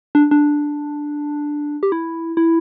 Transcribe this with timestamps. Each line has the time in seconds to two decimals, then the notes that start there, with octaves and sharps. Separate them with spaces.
0.15 D4
0.31 D4
1.83 G4
1.92 E4
2.37 E4